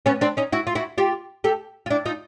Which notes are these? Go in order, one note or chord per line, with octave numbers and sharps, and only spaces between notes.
B3 C#4
C4 D4
C#4 D#4
E4 F#4
F4
E4 F#4
F4 G4
G4 A4
F4
D4 E4
D#4 F4